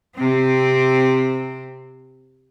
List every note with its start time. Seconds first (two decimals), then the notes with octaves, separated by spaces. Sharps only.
0.16 C3 C4